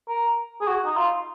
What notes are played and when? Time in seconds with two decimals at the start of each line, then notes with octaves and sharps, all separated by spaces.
0.08 A#4
0.61 G#4
0.68 F#4
0.85 D#4
0.97 F4